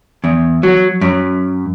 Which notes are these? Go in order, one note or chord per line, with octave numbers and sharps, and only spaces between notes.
E2
F#3
F#2